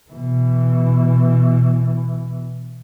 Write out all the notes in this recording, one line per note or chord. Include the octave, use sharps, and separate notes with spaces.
B2 E3